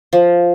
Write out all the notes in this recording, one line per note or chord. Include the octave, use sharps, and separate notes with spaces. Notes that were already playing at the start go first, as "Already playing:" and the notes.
F3